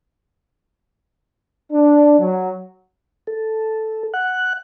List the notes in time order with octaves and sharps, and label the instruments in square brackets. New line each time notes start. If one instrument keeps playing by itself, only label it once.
[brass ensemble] D4
F#3
[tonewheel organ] A4
F#5 F#6